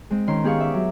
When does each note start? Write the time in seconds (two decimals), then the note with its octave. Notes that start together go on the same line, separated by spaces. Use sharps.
0.10 G#3 C4
0.27 D#3 C#4 C6
0.44 B3 G4 G#4 F5 C#6
0.60 E5 D6
0.74 F#3